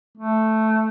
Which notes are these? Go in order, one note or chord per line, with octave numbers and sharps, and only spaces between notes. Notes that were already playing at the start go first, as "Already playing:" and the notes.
A3